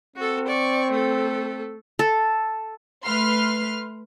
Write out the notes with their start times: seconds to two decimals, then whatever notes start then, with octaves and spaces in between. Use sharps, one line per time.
0.16 C4 F#4 A4
0.47 D5 C#6
0.91 A3 A4
1.99 A4
3.04 A3 B4 C6 F6